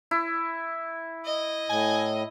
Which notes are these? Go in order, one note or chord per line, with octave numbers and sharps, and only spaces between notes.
E4
D#5
A2 G#5